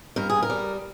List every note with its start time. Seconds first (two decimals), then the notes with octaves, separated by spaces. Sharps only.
0.16 G2 A#4
0.29 G#4
0.42 A#4
0.50 G3